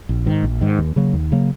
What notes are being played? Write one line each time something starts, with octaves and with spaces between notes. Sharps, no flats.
A#1
G#2 D#3
A#1
G#2 D#3
D#2
C#3 F#3 A#3
D#2
C#3 F#3 A#3